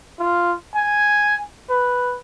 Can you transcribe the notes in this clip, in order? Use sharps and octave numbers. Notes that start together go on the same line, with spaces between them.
F4
G#5
B4